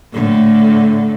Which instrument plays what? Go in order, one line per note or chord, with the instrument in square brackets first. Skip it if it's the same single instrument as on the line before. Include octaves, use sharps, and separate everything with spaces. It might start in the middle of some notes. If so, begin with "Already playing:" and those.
[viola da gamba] A2 D3